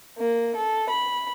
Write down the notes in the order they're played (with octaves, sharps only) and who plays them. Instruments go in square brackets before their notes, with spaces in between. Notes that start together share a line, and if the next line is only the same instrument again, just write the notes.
[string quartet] A#3
A4
B5